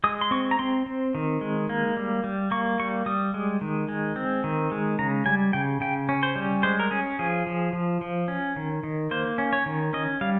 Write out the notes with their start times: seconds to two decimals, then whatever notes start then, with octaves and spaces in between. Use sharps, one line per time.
0.04 G#3 D#6
0.21 C6
0.31 C4 C#6
0.51 A#5
0.59 C4 C6
0.86 C4
1.15 D#3
1.41 G#3
1.69 A#3
1.97 G3
2.24 G3
2.51 A#3 C#6
2.79 G3 C#6
3.06 G3 D#6
3.34 G#3
3.61 D#3
3.88 G#3
4.16 C4
4.44 D#3
4.72 G#3
4.99 C#3 A#5
5.26 G3 G#5
5.53 C#3 G5
5.81 C#3 G5
6.09 C#4
6.23 C5
6.36 G3
6.63 G#3 C5
6.80 A#4
6.91 C#4 G#4
7.19 F3 G#4
7.47 F3
7.73 F3
8.01 F3
8.28 C#4
8.56 D#3
8.83 D#3
9.11 A#3 C5
9.38 C#4
9.53 C#5
9.66 D#3
9.93 C#4 D#5
10.21 G3 F5